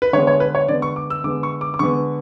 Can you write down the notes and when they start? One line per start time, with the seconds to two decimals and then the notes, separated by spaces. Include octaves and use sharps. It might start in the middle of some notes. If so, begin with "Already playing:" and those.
0.02 B4
0.13 D3 G#3 B3 C#5
0.27 C#5
0.40 B4
0.55 C#5
0.68 D3 G#3 B3 D5
0.82 C#6
0.96 D6
1.10 E6
1.24 D3 G#3 B3 D6
1.43 C#6
1.61 D6
1.74 D6
1.79 D3 G#3 B3 C#6